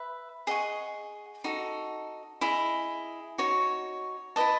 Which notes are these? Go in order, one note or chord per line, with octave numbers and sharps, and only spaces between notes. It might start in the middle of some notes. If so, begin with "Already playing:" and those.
Already playing: B4 E5
G#4 D#5 F#5 C#6
D#4 F#4 A4
E4 G#4 D#5
D#4 F#4 C#5
E4 B4 D#5 A5